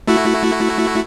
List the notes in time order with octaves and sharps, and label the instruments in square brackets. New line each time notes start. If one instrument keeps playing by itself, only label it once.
[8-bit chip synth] A3 E4 F#4